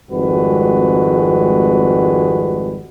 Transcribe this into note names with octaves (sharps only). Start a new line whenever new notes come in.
G#1 F2 G3 G#3 F#4 B4